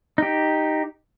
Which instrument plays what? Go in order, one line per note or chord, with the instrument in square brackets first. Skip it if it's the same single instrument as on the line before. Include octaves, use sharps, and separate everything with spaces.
[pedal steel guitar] D#4 G4